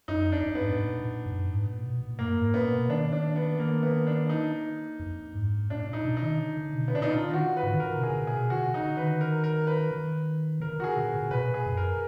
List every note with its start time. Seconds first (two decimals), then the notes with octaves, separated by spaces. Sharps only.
0.08 F#2 D#4
0.26 F2
0.32 D4
0.43 F2
0.55 B3
0.61 G#2
0.71 G#2
0.79 A#2
1.02 A#2
1.26 F#2
1.49 G#2
1.66 A#2
1.84 B2
2.01 A#2
2.19 F#2 A#3
2.37 G#2
2.54 A#2 B3
2.72 B2
2.89 D#3 D4
3.12 D4
3.36 B3
3.60 D#3 A#3
3.83 B3
4.07 D4
4.29 D#4
5.00 F2
5.34 G#2
5.70 A#2 D4
5.87 A#2
5.93 D#4
6.05 B2
6.17 D#4
6.23 D#3
6.40 D3
6.57 D3
6.75 B2
6.88 B3
6.92 A#2 D4
7.02 D#4
7.10 D3 F4
7.28 D#3 F#4
7.45 D3
7.57 B4
7.63 G#2
7.71 D#3
7.80 D3 A#4
7.97 B2
8.03 G#4
8.10 B2
8.15 A#2
8.27 G#4
8.32 B2
8.50 D3 F#4
8.74 D3 D#4
8.97 D#3 B4
9.21 A#4
9.44 A#4
9.67 B4
9.91 D#3
10.60 D3 A#4
10.79 D3 F#4
10.84 G#4
10.97 A#2
11.14 A#2
11.31 B2 B4
11.49 A#2 G#4
11.66 F#2
11.77 A#4